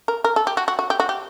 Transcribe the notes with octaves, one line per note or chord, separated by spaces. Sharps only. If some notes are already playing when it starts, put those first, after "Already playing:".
A#4
A#4
A4
G4
F#4
F#4
F#4
G4
F#4
G4